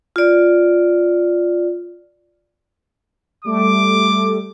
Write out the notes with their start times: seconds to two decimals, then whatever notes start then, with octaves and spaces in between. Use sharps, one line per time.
0.16 F4 D5
3.44 G3 A3 A4 D6